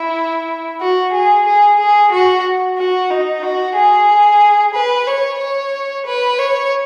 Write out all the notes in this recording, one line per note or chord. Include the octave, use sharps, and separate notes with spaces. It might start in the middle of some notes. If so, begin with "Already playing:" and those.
Already playing: E4
F#4
G#4
G#4
G#4
F#4
F#4
D#4
F#4
G#4
B4
C#5
C#5
B4
C#5